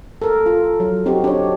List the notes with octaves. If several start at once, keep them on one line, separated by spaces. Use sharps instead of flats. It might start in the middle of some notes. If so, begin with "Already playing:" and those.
A4 A#4
F4
F#3
C4 D#4 F#4 G4
D4 C#5